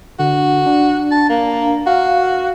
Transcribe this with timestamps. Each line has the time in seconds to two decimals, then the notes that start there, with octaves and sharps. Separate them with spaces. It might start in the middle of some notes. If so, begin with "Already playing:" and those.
0.19 D3 F#4
0.66 D4
1.11 A5
1.29 A#3
1.86 F#4 F5